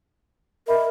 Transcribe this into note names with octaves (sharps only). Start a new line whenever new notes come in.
A#4 D#5 E5 B5